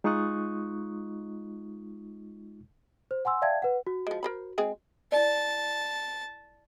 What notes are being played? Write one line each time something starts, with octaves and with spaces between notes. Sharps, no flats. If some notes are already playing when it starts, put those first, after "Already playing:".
G#3 D#4 F4 C#6 D#6 F#6
C5
F#5 G#5 C6 E6
D5 E5 F5 G5 A5 G#6
B4 F#5
F#4
F3 G#3
A#4 C5 B5
G#3 C4 G#4
E4 D5 A5